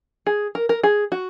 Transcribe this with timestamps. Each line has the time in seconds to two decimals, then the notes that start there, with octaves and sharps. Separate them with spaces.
0.27 G#4
0.55 A#4
0.69 A#4
0.83 G#4
1.12 F#4